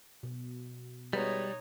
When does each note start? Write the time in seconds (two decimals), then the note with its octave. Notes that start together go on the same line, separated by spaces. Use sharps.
0.23 B2
1.13 G3 G#3 B3 D#4 F#4 C#5